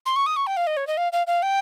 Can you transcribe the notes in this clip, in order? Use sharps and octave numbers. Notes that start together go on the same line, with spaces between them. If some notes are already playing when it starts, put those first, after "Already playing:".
C6
C#6
D#6
C#6
G5
F5
D#5
C#5
D#5
F5
F5
F5
G5